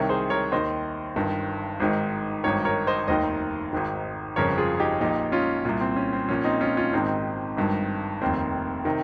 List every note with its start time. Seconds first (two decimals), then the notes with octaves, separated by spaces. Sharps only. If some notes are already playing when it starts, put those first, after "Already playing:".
Already playing: C2 C3 D#3 A#4 C#5
0.09 G#4 C5
0.30 A#4 C#5
0.52 D#2 D#3 C5 D#5
1.16 G1 G2 D#3
1.80 G#1 G#2 D#3
2.44 G#1 G2 D#3 A#4 C#5
2.65 A#4 C#5
2.87 C5 D#5
3.08 F1 D#2 D#3 C5 D#5
3.73 G#1 G#2 D#3
4.36 G1 F2 C#3 A#4 C#5
4.58 F4 G#4
4.79 D#4 G4
5.01 A#1 A#2 D#4 G4
5.32 C#4 F4
5.65 C2 A#2
5.81 C4
5.96 C#4
6.13 C4
6.29 A#1 A#2 C#4
6.45 C4 D#4
6.61 C#4 F4
6.77 C#4 F4
6.93 G#1 G#2 D#3 C4 D#4
7.57 G#1 G2 D#3
8.22 F1 D#2 D#3 C4
8.85 C3 D#3